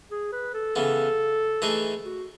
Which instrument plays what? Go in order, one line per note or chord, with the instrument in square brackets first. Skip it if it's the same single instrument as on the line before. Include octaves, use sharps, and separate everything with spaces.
[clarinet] G#4
B4
A4
[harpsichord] C#3 E3 B3 [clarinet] A4
[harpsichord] E3 A3 D#4 G#4
[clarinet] F#4